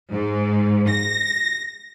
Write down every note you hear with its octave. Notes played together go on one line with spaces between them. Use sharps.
G#2
A#6